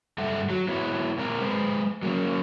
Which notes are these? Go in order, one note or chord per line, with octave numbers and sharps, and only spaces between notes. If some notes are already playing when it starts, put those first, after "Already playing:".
G2 A4 E5 F#5
F#3 F#4
B3 E4 F#4 C#5
A#2 C4 A#4
G#3 B4 C5
F#3 A#3 C4 C#4